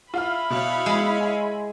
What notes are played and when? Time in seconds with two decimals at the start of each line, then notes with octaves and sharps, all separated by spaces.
0.14 E4 F4 F5 B5 F6
0.50 B2 C#5 F5
0.86 G#3
1.21 G#5